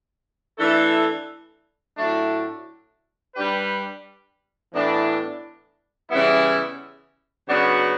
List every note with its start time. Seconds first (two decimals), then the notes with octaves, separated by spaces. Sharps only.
0.59 E3 A3 D4 A4
1.97 A2 F#3 A3 D4
3.34 G3 D4 G4 B4
4.72 A2 E3 B3 D4
6.10 C#3 E3 G3 B3 E4
7.48 C#3 F#3 B3 D4 F#4